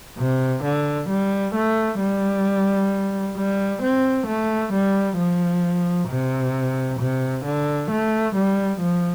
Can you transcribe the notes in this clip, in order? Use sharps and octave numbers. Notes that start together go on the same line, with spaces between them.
C3
D3
G3
A3
G3
G3
C4
A3
G3
F3
C3
C3
D3
A3
G3
F3